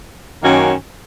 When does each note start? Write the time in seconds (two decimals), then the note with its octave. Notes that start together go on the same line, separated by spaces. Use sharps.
0.43 F#2 D#3 A#3 C#4 F#4